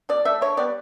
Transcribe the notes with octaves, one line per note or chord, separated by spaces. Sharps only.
B2 D5
A3 E5
D3 C#5
G3 B3 D5